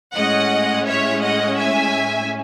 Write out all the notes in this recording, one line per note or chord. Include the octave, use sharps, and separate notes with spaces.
A2 G#3 C#4 D#5 F#5
C#5 E5
D#5 F#5
E5 G#5